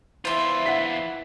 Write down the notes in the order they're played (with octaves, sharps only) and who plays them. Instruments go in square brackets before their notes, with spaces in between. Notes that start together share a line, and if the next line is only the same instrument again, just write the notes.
[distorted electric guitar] E2 F4 [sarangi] E3 [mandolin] C5 E5
[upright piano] F#5 B6